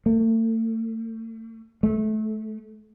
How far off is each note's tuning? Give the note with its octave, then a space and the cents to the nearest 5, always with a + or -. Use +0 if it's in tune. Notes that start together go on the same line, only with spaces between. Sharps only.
A3 +40
A3 -25